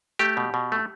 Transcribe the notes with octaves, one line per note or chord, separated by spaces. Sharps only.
A3 G4
B2
B2
A3